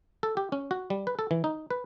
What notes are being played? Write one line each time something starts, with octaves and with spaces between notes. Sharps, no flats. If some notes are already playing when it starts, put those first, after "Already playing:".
A4
G4
C#4
F#4
G3
B4
A4
E3
D#4
B4